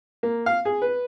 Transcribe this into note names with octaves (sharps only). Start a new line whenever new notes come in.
A#3
F5
G#4
B4